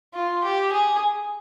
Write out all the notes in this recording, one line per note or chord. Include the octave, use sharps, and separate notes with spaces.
F4
G4
G#4